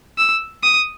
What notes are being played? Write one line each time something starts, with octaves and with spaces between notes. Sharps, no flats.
E6
D#6